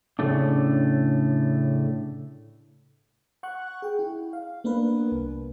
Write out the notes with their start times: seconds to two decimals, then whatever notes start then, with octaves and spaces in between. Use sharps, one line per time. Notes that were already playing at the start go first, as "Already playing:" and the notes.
0.19 A2 C#3 A3 D4
3.43 F#5 C#6 F#6
3.82 G#4 G5
3.99 E4
4.33 F5
4.64 A#3 B3 D4 A#4 B4
5.12 C2